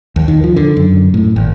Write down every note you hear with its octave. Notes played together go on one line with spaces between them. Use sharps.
D#2
D#3
F3
D3
F#2
A2
G#1